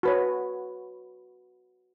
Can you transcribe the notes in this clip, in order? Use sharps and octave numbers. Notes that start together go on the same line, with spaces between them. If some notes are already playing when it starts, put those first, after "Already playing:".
F#4 B4 C#5